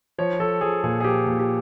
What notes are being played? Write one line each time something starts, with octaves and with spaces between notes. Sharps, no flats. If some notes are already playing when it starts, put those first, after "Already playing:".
F3 C#5
F3 A4
F3 G#4
A#2 G#4
G#4
F3 G4
A#2
G4